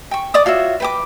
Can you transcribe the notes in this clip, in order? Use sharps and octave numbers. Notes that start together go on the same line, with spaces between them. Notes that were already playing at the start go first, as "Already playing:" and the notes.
G5 C#6
D5 D6 D#6
F4 F#4 C#5 E5
B4 G5 D6